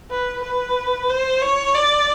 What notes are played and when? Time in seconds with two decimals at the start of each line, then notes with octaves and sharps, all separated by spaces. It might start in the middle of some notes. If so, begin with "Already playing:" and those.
0.11 B4
0.43 B4
1.09 C5
1.42 C#5
1.75 D5